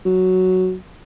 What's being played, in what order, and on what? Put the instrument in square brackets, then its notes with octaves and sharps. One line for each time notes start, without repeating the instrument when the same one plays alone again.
[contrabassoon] F#3